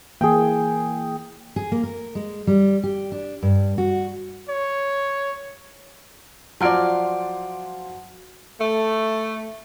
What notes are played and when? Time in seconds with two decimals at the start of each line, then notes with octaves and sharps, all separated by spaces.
0.21 E3 A#3 G#4 G5
1.56 G#4
1.72 A#3
1.83 A#4
2.15 G#3
2.47 G3
2.83 G4
3.12 D4
3.42 G2
3.78 F#4
4.49 C#5
6.61 F3 F#3 F#4 D5 F#5 F6 D7
8.60 A3